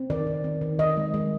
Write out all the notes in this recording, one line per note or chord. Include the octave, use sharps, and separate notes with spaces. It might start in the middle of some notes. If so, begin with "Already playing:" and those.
Already playing: C4
D#3 D5
D#3
C4
D#3
D#3 D#5
G#3
G#3